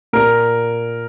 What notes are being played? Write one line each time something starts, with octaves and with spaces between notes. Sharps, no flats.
A#2 A#4